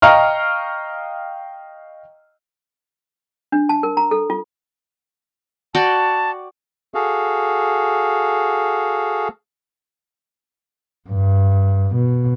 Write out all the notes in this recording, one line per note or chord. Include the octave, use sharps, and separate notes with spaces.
D#5 F5 G5 A#5 C#6 F6
D4
A5
A#4
A#5
A4
F4
F#4 D5 G5 A5
F#4 G#4 A4 F5
G2
B2